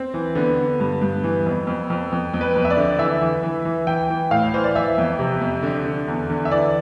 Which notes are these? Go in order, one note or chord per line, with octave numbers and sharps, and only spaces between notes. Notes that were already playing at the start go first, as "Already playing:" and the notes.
Already playing: C4
E3
D3 B3
D3
G2
G2
E3
F2
F2
F2
F2
F2
B4
F2
E5
D5
D3
E3 E5
E3
E3
E3
E3 G5
E3
A2 F5
E3 C5
D5
E3 E5
F2
C3
F2
D3
D3
E2
D3
E5
E3 D5